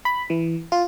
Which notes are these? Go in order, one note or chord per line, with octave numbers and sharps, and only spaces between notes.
B5
E3
F4